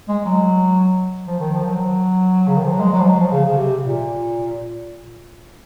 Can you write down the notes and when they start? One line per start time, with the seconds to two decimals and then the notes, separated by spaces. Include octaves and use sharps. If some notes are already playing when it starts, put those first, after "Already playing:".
0.09 G#3
0.25 F#3
1.27 F3
1.40 D#3
1.54 F3
1.66 F#3
2.48 C#3
2.56 D#3
2.64 F3
2.72 F#3
2.80 G#3
2.93 F#3
3.01 F3
3.07 F#3
3.20 F3
3.32 C#3
3.46 C#3
3.57 C3
3.83 A#2